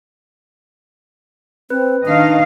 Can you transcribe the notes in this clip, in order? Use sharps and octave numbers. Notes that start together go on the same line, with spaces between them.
C4 B4
D#3 D4 D#5 F5